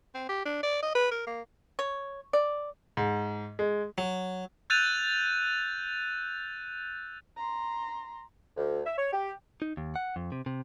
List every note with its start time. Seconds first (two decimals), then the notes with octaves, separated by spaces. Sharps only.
0.15 C4
0.29 G4
0.46 D4
0.63 D5
0.83 D#5
0.95 B4
1.11 A#4
1.27 A#3
1.79 C#5
2.33 D5
2.97 G#2
3.59 G#3
3.98 F#3
4.70 E6 F#6 G6 A6 D#7 F7
7.37 A#5 C6
8.57 D2
8.86 E5
8.98 C#5
9.13 G4
9.62 D#4
9.77 D#2
9.96 F#5
10.16 F2
10.32 C3
10.46 C3